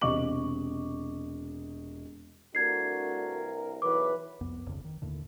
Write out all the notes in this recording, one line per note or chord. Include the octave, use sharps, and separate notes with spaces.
E1 C3 D#5 C#6 D6 F#7
C2 G2 A3 D4 F#4 A#4 G#6 C7
B1 E2 E3 F#3 B4 D6
C2 F2 B3
D1 G#1 F2 C#3
D#3
D#2 A2 D3